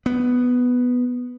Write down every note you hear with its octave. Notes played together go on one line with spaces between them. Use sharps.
B3